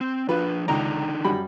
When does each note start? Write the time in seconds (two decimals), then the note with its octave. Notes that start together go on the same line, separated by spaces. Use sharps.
0.01 C4
0.28 F3 D4 F4 B4
0.68 C#2 D3 D#3 D#4 D5 A#5
1.24 F#2 G3 B5